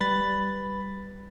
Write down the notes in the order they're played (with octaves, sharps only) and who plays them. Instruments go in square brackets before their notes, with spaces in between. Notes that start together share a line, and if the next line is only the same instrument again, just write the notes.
[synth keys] G3 [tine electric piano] B4 B5 A6